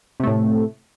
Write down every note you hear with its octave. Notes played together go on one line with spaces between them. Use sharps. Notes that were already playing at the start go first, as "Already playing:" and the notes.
A2 C3 A3